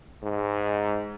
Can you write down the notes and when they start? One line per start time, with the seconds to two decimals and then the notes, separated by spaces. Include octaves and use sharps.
0.23 G#2